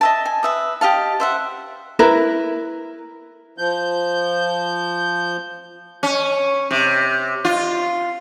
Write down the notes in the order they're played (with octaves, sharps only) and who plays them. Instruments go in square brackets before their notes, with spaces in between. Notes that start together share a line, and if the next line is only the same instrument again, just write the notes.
[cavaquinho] D#5 E5 A5
G#5
B4 E5 D#6
G4 D#5 F5 A5
C5 E5 F#5
[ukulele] E4 A#4 B4
[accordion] F3 G6
[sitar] C#4
C3
F4